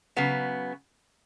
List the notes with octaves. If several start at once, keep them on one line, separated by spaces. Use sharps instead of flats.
C#3 F#3 B3